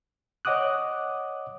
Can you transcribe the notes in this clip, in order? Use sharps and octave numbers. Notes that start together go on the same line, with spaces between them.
C#5 D#5 F#5 D6 D#6 F#6